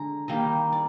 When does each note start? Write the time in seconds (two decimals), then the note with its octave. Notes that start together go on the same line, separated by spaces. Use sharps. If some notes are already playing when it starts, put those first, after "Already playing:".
Already playing: D3 G#3 A#5
0.28 D#3 G3 A#3 D#5
0.73 D5